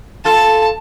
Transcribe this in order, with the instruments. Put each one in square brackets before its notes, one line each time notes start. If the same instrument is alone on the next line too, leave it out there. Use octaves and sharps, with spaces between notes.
[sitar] F4 A4 [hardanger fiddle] A5